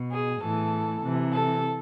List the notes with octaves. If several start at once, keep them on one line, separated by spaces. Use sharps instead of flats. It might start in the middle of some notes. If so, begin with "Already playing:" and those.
Already playing: B2
G#4
A2 E3 A4
C3 E3
A4